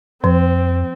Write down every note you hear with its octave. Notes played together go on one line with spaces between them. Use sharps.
F2 F3 C4